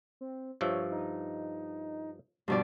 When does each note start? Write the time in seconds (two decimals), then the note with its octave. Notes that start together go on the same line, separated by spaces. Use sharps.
0.21 C4
0.61 G2 F3 C#5 E5
0.91 D#4
2.48 G2 B2 F3 D5